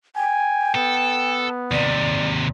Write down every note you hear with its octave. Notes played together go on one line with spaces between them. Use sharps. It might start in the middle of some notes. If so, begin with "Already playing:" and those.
G5 G#5
B3 A4
D#2 C3 D5